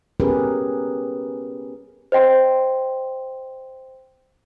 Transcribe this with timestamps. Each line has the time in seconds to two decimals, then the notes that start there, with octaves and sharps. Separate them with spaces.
0.20 B3 C#4 G4 G#4 A#4 B4
2.12 C5 D#5 G5 C6